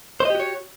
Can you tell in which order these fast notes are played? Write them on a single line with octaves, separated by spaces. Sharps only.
C5 D#5 G4 F#4 C#5